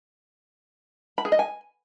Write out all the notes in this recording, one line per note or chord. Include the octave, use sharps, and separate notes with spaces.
B5
G#4
D#5
G#5